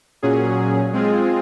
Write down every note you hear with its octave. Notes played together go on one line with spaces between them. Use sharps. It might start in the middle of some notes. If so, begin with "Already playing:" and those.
A#2 F#3 C#4 G#4
G#3 C4 F4 G#4